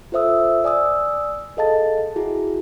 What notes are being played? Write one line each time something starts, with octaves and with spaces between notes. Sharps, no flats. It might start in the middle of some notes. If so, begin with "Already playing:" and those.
F4 A4 C5 E5 D#6 E6
D5 G#5 D#6 E6
G#4 A4 D#5 F5 A5 A6
E4 F#4 G#4